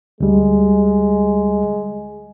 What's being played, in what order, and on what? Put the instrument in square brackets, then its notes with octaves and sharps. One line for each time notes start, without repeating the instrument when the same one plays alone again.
[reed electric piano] D2 G3 [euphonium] G#3